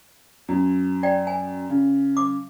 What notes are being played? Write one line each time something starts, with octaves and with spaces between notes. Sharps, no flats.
F#2
D5 G5
G#5
C#3
D6